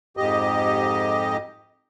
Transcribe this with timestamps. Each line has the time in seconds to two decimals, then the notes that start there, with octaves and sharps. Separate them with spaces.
0.17 F2 G#2 G4 D#5